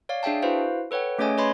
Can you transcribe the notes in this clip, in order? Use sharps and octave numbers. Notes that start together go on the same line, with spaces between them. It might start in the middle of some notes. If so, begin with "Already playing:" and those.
C#5 D5 F5
D4 G#4 E5 G5 A5
E4 F#4 B4 C5 F5
A4 B4 C#5 F#5 G5
A3 C#4 G#4 C#5 D#5 G#5
B4 C#5 D#5 B5 C6 G#6